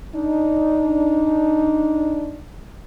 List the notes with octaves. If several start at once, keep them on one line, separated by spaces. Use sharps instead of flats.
D4 D#4